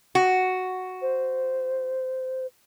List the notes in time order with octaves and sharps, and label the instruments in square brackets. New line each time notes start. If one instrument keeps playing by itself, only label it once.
[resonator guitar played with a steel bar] F#4
[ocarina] C5